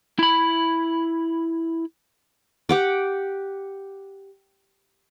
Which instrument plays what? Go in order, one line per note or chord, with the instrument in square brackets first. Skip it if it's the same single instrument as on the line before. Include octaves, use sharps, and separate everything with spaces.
[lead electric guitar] E4 B5
[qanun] G4 F#5 D6